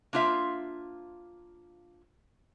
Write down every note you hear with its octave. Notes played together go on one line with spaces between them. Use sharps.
A#3 D4 F4 C5 E5